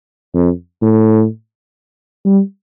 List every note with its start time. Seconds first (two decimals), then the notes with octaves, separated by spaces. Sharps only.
0.34 F2
0.82 A2
2.25 G3